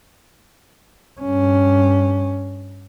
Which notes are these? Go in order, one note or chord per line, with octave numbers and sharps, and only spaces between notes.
G2 C#4